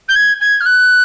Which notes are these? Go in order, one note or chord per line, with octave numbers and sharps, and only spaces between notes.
G6
G#6
G#6
F6
F#6